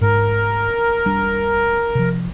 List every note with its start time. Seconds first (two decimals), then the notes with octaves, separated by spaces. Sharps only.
0.01 G#2 G#3 A#4
1.05 E1 G3 D4
1.95 C3 F3